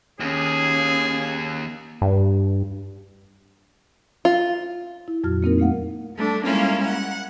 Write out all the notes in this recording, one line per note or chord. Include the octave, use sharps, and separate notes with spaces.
D#2 C#4 G#4
G2
F4
E4
F2 A#2 F#3 F#4 F6
A#3 C4 D#4 A#4
A3 A#3 F5 F#5
G3 A3 D4
G3 G#3 A#3 C#4 E4 F4
F#5